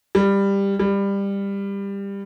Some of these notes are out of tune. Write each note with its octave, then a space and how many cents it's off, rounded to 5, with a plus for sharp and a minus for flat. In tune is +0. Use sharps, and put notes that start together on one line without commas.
G3 +15
G3 +20